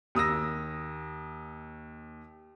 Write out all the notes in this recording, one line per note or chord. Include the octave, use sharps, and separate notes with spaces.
D#2 D#6 E6 A#6